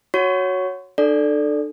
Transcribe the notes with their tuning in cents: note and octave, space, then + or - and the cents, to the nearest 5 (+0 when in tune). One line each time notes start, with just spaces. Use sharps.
F#4 -5 C#5 +0 C#6 +5
D4 +40 A4 +0 D5 +0